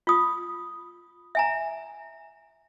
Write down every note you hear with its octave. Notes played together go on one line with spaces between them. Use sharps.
F4 D#6
E5 G#5 A#5